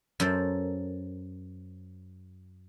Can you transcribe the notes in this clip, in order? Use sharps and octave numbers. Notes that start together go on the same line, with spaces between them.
F#2 A4 A#4 C5